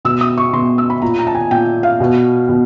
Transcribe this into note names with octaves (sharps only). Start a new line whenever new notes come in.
B2 E6
D#6
C#6
B2 C6
E6
B5
A#2 A#5
A#5
A5
G#5
A#2 G5
F5
B2
B2